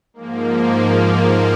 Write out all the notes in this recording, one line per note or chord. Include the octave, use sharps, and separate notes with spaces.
G#2 F3 A#3